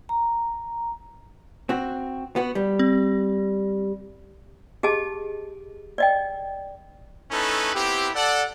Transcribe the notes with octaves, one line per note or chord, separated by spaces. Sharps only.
A#5
C4 F#4
B3 F#4
G3
C4
G4 G#4 D#5 A5
D5 D#5 G5
A3 C#4 D#4 E4 A4 B4
B3 C4 E4 G4
A4 D5 F#5